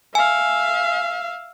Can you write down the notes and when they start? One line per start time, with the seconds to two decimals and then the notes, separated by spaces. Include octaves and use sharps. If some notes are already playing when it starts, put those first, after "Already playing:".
0.15 E5 F5 G#5